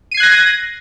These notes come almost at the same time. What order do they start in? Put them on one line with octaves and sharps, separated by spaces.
D#7 C7 G#6 F#6 A#6